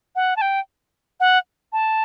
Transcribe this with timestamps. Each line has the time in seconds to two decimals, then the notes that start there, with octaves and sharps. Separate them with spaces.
0.16 F#5
0.36 A5
0.41 G5
1.20 F#5
1.73 A5